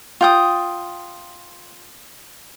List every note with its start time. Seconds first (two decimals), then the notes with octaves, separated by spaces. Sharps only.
0.21 F4 G5 D#6